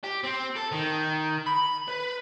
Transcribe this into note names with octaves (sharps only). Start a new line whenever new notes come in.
G4
C4
A4
D#3
B5
B4